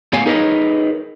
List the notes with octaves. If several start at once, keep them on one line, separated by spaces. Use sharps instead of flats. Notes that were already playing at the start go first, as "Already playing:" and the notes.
A2 B3 C#5 F5 G#5
D#4 G#4 A#4 B4 C#5 D#5